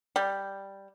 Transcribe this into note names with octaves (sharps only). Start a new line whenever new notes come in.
G3